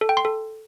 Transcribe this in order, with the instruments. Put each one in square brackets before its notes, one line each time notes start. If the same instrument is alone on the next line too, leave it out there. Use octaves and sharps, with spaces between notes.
[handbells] A4
G5
C6
A4